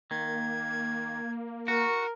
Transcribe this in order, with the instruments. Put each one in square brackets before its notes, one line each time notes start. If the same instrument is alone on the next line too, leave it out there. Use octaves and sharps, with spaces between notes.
[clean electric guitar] D#3 [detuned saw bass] A#3 [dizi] G#6
[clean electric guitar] F#4 [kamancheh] A#4 [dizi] C#6